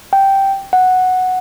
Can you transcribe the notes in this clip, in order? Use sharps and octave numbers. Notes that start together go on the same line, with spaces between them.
G5
F#5